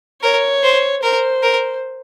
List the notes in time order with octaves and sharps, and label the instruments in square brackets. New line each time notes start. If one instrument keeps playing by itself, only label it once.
[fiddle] A#4 [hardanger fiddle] C#5
[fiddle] C5
[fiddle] A#4 [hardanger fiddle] C5
[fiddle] A#4